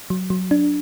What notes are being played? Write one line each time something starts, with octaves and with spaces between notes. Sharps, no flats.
F#3
F#3
D4